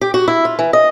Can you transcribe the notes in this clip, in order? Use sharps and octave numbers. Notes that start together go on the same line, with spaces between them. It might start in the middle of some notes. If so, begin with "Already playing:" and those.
G4
F#4
E4
F4
E3
D#5